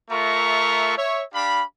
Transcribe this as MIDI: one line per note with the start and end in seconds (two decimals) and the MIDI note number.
0.11 0.93 57
0.11 0.93 65
0.11 0.93 70
0.11 0.93 76
0.11 0.93 82
0.11 0.93 85
0.97 1.22 73
0.97 1.22 76
1.33 1.62 62
1.33 1.62 67
1.33 1.62 77
1.33 1.62 83